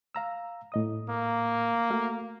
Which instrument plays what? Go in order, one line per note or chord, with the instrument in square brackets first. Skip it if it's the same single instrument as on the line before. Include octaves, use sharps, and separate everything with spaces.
[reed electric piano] F5 A#5 E6
A2 D#5 D#6
[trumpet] A#3
[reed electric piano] A3 F#4 F5